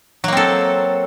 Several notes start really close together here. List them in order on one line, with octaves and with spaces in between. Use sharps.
F#3 A#3 C4 A4